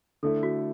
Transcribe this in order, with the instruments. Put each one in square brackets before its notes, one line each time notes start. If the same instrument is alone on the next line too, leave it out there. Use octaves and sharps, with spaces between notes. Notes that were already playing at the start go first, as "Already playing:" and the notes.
[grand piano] D3 A3 E4 [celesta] A4
[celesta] F#4